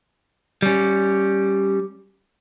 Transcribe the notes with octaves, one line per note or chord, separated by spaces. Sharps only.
G3 C#4